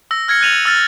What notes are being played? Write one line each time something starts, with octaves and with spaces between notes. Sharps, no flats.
E6 A#6
F6 G#6 A#6 C#7
F#6 A6 D#7 F7 F#7
E6 F6 A6